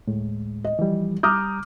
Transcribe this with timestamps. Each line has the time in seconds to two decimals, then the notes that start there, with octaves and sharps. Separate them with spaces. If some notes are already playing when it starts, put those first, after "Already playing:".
0.08 D2 A2 G#3
0.64 D#5
0.79 E3 F3 G3
1.23 G3 A#5 D6 D#6 F6 G6